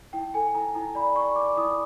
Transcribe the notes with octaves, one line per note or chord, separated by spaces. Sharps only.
E4 G5
A4 G#5
E4 A#5
E4 A#5
D5 B5
D5 C#6
D5 D6
E4 D#6